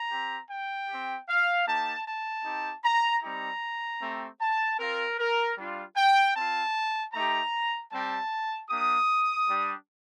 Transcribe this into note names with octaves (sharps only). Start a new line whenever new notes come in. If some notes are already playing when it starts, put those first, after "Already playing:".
Already playing: A#5
C4 G4
G5
C4 G4
F5
A#3 D#4 G4 A5
A5
C4 D#4 G4
A#5
G3 C4 D#4 G4 A#5
A3 C4 G4
A5
C4 F4 A#4
A#4
G3 D4 F4
G5
C4 F4 A5
A3 D#4 G4 A#5
G3 C4 G4 A5
A#3 D4 G4 D#6
G3 D4 G4